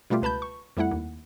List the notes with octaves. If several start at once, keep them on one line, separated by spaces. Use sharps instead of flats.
B2 G3 A3 F4 G4
C#2 B4 A5 B5 G6
C#6
F2 G3 A3 E4 F#5
D#2